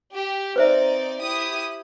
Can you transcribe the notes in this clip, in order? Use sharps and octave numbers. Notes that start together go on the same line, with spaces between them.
G4
C4 D#4 B4 C5 D5 E5
E4 G4 D#6